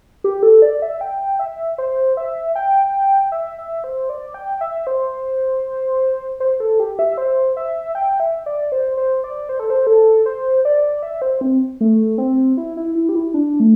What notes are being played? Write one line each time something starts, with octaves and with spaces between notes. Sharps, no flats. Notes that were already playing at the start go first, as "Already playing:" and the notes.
G4
A4
D5
E5
G5
E5
C5
E5
G5
E5
E5
C5
D5
G5
E5
C5
C5
A4
G4
E5
C5
E5
G5
E5
D5
C5
C5
D5
C5
A4
C5
A4
C5
D5
E5
C5
C4
A3
C4
E4
E4
E4
G4
E4
D4
A3